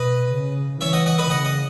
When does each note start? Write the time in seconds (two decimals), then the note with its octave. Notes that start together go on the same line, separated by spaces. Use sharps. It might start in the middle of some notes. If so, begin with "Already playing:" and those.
Already playing: B2 B4 D#5
0.31 C#3
0.81 E3 C#5 E5
0.93 D#5 F#5
1.06 D#5 F#5
1.18 B4 D#5
1.30 C#3 D#5 F#5
1.45 D#5